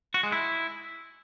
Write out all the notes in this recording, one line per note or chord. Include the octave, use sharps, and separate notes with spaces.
F#4
G#3
E4